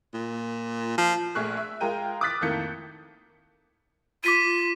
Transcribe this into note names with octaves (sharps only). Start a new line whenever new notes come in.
A#2
F3
A#1 A3 G#4 C#6 F6 F#6
E5
G#3 F4 A#4 G5 D#7
D6 D#6 F6 F#6 A6 B6
F2 A2 D#3 A#3 G6 C#7
F4 D6 B6 D#7